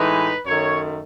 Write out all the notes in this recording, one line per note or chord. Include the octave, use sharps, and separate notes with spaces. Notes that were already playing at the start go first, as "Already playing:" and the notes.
Already playing: A2 E3 G#3 D#4 B4
F#2 D#3 A3 C#5